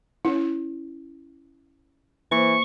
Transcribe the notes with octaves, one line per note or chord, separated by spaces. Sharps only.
C#4 E4 C#5
E3 A#3 C5 C#6